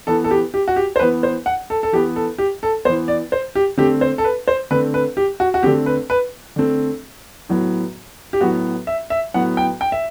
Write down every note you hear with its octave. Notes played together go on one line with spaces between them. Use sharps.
E3 B3 A4
A4
G4
G4
F#4
G4
C5
E3 B3 B4
C5
F#5
A4
A4
E3 B3 G4
A4
G4
A4
E3 B3 C5
D5
C5
G4
D3 A3 C4 G4
C5
A4
B4
C5
D3 A3 C4 B4
B4
G4
F#4
F#4
D3 A3 C4 G4
B4
B4
D3 A3 C4
A2 F#3 B3
G4
A2 F#3 B3 F#4
E5
E5
A2 F#3 B3 F#5
G5
G5
E5